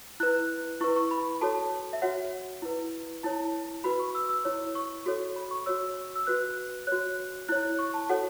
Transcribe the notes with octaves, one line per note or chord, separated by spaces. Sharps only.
E4 B4 F#6
E4 B4 C#6
C#6
B5
F#4 A4 C#5 A5
E5
F#4 C#5 F#5
E4 B4
E4 C#5 A5
F#4 B4 B5
C#6
E6
E6
E4 C#5
C#6
F#4 A4 C#5
B5
C#6
F#4 C#5 E6
E6
F#4 B4 F#6
F#4 C#5 F#6
E4 C#5 F#6
C#6
A5
F#4 A4 C#5 F#5